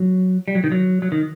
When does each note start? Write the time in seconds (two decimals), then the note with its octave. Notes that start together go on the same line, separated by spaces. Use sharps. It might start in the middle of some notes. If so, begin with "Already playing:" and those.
Already playing: F#3
0.48 G3
0.55 F#3
0.64 D#3
0.72 F#3
1.02 F#3
1.12 D#3